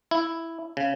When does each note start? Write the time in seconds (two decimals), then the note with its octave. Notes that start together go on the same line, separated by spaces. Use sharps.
0.11 E4
0.77 C#3